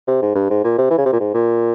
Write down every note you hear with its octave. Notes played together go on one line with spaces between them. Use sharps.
C3
G#2
G2
G#2
A#2
C3
E3
C#3
C3
A#2
G#2
A#2